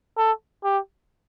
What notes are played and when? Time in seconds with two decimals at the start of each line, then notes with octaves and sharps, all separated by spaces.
0.17 A4
0.64 G4